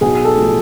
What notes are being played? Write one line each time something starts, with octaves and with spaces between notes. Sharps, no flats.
B1 G#4
A4
A2 F3